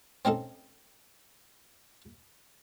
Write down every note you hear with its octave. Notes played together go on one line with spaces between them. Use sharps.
C4 C#4 D#4 A4